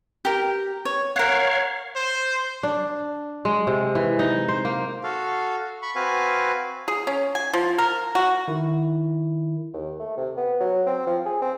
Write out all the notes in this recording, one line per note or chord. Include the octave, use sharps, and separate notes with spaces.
G4 A#4
C#5
A#4 C#5 F5 F#5
C5
D4
G#3
C3
E3
D#4
C5
A#3
F#4 A4 F5
B5 C#6
C4 F#4 B4 F5 G#5
G#4
C#4
G#5
F3
A#4
F#4
D#3 E4
D#2
A3
C3
B3
F#3
C4
F3
G#4
C4